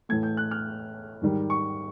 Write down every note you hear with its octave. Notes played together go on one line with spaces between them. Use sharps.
A2 E3 A3 G#6
G6
F#6
F6
G#2 D#3 G3
C#6